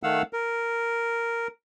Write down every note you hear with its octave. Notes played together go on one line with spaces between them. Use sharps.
D#3 A3 F5 F#5 E6
A#4